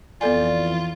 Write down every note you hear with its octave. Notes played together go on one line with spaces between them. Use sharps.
F2 E3 B3 F4 A4 D5 G#5